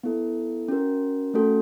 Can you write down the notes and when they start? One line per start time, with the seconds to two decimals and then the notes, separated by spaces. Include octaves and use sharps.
0.03 B3 E4 A4
0.68 C#4 F#4 A#4
1.34 A3 C#4 F#4 A4